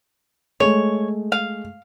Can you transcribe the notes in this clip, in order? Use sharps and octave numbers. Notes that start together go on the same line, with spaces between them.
G#3 A3 C#5
F5